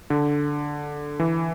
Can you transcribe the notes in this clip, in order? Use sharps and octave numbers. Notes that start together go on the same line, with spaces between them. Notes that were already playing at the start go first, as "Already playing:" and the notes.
D3
E3